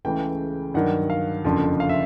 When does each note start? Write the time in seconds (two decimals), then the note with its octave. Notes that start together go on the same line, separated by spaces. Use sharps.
0.05 C#2 C#3 E3 A3 G5
0.74 G2 D#3 F#3 F#5
1.10 F5
1.45 F#1 F2 D3 F3
1.80 F5
1.89 E5